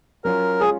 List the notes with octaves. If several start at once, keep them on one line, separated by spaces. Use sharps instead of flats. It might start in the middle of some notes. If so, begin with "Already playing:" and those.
F#3 C#4 F4 A#4
G#3 C#4 F4 G#4